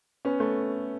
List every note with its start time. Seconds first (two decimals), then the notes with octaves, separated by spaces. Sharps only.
0.25 B3 C#4
0.40 A3 B3